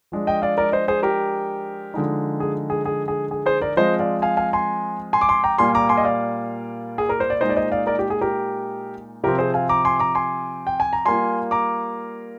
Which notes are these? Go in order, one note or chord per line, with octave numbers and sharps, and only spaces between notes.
F3 G#3 D4
D#5 G5
D5 F5
A#4 D5
C5 D#5
G#4 C5
G4 A#4
D3 F3 G#3 D#4
G#4
G#4
G#4
G#4
G#4
G#4 C5
A#4 D5
F3 G#3 C4 F4 C5 D#5
D5 F5
F5 G#5
F5 G#5
G#5 C6
G#5 C6
D6
G#5 C6
G5 A#5
A#2 G3 A#3 F4 G#5 C6
A#5 D6
G#5 C6
D#5
D5 F5
G#4
A#4
C5
D5
A#2 G#3 D#4 C5 D#5
D5
C5 D#5
D5 F5
A#4 D5
G4
G#4
G4 A#4
C3 F3 C4 G4 A#4
G#4 C5
F5 G#5
A#5 D6
G#5 C6
A#5 D6
G#5 C6
G5
G#5
A#5
G3 A#3 F4 G#5 C6
A#5 D6